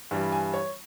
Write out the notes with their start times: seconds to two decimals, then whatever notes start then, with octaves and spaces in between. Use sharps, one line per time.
0.11 G2 E3 G3
0.32 G#5
0.54 C#5